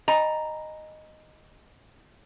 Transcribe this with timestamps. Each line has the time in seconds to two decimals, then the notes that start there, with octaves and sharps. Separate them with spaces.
0.08 D#5 G#5 A#5 B5